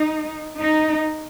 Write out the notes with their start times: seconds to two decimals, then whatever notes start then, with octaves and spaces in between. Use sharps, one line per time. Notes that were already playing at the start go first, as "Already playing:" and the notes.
Already playing: D#4
0.58 D#4